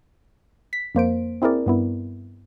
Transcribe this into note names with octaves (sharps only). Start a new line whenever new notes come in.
B6
F2 A#3 C5 D7
C4 E4 G#4 A#4 D5
G2 B3 E4